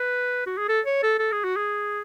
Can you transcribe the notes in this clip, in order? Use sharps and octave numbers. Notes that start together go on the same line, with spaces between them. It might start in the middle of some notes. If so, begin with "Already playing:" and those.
Already playing: B4
F#4
G#4
A4
C#5
A4
A4
G#4
F#4
G#4